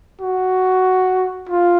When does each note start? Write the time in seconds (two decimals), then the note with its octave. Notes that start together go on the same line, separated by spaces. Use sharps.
0.21 F#4
1.49 F4